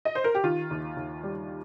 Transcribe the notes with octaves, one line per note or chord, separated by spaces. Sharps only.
D#5
C5
A#4
G4
D#3 F4
D#2
D#2
G3